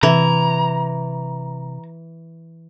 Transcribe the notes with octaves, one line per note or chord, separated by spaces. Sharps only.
C3 E3 A#5